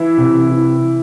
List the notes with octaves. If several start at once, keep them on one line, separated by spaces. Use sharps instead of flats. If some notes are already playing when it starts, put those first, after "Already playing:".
Already playing: E3 E4
C3
E3